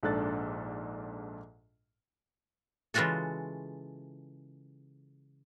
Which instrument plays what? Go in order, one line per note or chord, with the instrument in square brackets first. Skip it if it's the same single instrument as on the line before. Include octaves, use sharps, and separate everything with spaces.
[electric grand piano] A#1 G#2 D4 A4 F#6 A6
[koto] C#3 E3 G#3 F4 F#4 A4